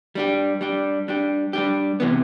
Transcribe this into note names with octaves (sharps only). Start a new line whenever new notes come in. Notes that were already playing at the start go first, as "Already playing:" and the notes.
G3 D4 G4
G3 D4 G4
G3 D4 G4
G3 D4 G4
C3 E3 B3